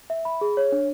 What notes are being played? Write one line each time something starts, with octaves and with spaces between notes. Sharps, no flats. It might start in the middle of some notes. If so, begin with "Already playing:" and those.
E5
B5
G#4
C#5
D4